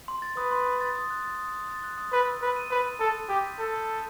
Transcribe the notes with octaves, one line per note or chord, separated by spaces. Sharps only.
C6
A6
B4 D#6
C6
C6
A6
D#6
F#6
A6
D#6
D#6
A6
F#6
D#6
B4 A6
E6
B4 E6
D#7
B4 B5
B5
A4 A6
E6
G4 G6
B6
A4 G6
G6
G6